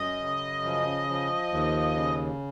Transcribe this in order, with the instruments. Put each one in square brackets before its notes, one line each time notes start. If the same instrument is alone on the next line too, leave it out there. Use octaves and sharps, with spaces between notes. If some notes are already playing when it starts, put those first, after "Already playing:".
Already playing: [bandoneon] F#2 [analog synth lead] D#5
[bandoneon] C#3
F3
F3
D#2
C#3